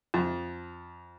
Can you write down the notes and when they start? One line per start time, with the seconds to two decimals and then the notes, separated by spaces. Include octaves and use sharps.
0.14 F2